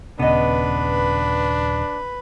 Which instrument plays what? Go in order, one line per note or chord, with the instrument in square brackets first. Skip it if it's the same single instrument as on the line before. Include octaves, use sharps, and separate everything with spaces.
[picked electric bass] D#1 C#3 [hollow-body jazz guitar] B3 D#5 [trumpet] D4 [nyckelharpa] B4